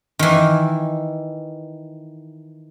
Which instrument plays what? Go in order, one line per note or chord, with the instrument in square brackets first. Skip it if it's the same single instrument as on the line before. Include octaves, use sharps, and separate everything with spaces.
[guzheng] D#3 E3